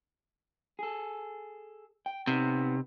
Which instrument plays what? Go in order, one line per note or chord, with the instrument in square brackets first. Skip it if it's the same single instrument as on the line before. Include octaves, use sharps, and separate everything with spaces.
[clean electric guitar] G#4 A4
G5
[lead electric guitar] C3 [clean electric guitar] B3 D#4